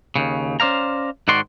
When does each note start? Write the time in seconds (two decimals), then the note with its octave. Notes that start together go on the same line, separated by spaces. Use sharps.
0.16 D#2 C#3
0.60 C#4 C5 D5 F5 A#5
1.28 G#2 D#3 F#4 D5 C6